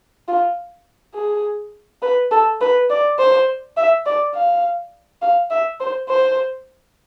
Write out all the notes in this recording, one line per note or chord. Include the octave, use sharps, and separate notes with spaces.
F4
G#4
B4
A4
B4
D5
C5
E5
D5
F5
F5
E5
C5
C5